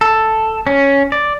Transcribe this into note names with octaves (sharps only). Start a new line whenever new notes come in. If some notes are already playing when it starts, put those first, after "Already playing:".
A4
C#4
D5